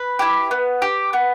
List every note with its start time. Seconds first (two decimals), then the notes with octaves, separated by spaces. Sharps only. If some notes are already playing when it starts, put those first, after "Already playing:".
Already playing: B4
0.19 E4 G4
0.51 B3
0.82 G4
1.13 B3